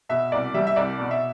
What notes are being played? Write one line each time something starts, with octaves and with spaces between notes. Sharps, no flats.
B2 E5
C2 D5
G3 E5
E5
C2 D5
B2
E5